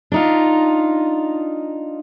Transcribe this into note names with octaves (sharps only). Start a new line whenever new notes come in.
D4 D#4 F4